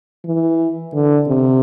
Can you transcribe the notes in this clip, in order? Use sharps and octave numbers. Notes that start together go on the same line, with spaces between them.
E3
D3
C3